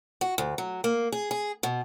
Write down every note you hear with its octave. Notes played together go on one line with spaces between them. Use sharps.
F#4
D2
F#3
A#3
G#4
G#4
B2